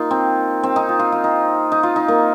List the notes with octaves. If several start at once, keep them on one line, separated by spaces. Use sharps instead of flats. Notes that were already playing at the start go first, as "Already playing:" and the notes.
Already playing: A#3 D#4 F4
C4
C4
D#4
F4
F4
F4
D#4
D#4
F4
D#4
A#3